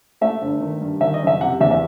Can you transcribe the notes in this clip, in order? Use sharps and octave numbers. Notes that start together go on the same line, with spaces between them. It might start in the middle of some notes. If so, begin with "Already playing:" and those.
A3 E5
G1
D#3
G2
D#3 E5
D#5
F#1
E5
C3 F#5
E2 E5
E5